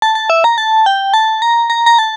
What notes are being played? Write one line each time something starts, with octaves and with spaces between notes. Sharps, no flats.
A5
A5
E5
A#5
A5
G5
A5
A#5
A#5
A#5
A5